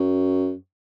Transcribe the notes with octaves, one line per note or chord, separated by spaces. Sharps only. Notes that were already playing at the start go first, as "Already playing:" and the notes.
Already playing: F#2